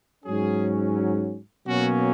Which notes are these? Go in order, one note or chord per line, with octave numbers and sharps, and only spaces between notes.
G#2 F#3 C#4 G#4
B2 F#3 A#3 C#4 F#4